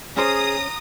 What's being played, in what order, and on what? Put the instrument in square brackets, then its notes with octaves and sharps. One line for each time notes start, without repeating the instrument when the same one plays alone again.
[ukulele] C#4 C5 C#5 [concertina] G#4 [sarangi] A#5 [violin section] D#6